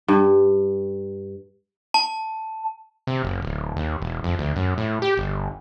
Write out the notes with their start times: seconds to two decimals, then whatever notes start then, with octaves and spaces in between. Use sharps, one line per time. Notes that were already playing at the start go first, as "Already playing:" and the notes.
0.08 G2
1.94 A5
3.07 C3
3.24 F#1
3.42 D1
3.76 D#2
4.02 E1
4.24 F2
4.39 D2
4.56 F#2
4.78 A2
5.02 G4
5.18 G1